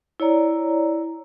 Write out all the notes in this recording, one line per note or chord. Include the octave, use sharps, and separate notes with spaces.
E4 C#5 D5 A#5